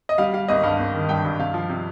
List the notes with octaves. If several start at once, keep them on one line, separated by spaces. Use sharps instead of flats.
D#5
G3 F5
G3 F5
G#1 D#5
G2 F5
G#1
D#3
G2 G5
G2
C3 F5
F3
C3